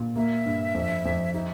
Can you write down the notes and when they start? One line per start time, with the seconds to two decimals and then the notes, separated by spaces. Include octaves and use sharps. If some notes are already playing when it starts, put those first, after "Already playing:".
Already playing: A#2
0.16 A#3 E5
0.46 G2
0.75 F2
1.05 F2
1.34 D#4 E5